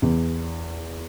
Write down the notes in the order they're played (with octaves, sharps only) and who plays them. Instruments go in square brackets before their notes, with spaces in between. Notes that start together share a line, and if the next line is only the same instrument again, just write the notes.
[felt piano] E2